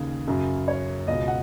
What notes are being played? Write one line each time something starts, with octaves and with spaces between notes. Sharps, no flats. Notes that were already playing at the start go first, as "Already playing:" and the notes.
Already playing: D#2 C#3 G#4
F#2 C#3
C#5
C#2 B2 D#5
F#5